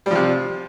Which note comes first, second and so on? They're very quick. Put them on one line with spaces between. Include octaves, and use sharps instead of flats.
G3 F3 C3